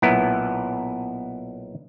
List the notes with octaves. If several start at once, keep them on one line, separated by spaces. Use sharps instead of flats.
B1 A#2 B3 E4